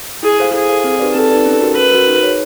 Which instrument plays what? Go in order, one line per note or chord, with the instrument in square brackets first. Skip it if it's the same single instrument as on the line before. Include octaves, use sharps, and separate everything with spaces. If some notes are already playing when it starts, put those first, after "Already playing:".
[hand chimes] E4 [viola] G#4
[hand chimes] A4 C5 F5
[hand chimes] E4 [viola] G#4
[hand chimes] A4 C5 F5
C4
D#4 G4 B4 D5
[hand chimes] C4 [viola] A4
[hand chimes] D#4 G4 B4 D5
C#4
F#4 A#4
[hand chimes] C#4 [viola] B4
[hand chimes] F#4 A#4
D#4
G#4 C#5